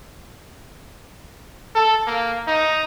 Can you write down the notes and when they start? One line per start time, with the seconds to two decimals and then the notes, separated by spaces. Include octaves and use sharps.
1.75 A4
2.07 A#3
2.48 D#4